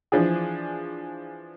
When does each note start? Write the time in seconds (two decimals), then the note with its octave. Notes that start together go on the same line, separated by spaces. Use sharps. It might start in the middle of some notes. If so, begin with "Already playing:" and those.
0.12 E3 F3 D4 G#4